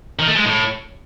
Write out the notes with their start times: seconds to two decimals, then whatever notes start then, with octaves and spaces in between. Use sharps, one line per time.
0.19 D#3
0.28 A3
0.36 G#3
0.45 A2